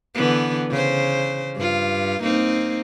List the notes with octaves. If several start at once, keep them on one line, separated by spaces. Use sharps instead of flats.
D3 E3 B3
C#3 C5
G2 F4
A#3 C4 D#4